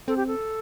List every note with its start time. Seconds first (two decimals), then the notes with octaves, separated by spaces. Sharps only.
0.08 C4 A4
0.17 G4
0.27 A4